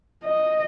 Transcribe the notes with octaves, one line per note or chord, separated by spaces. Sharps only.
D#5